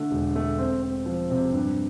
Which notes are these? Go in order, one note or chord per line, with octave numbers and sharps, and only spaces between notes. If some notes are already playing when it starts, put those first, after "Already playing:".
Already playing: D3 A3
E1
A3
C4
C4
F3
C3
G2